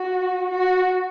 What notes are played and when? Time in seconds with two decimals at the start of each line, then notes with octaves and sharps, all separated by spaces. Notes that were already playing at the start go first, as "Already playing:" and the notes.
Already playing: F#4
0.50 F#4